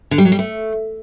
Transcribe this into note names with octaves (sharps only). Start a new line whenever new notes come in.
D3
G3
F#3
G3
A3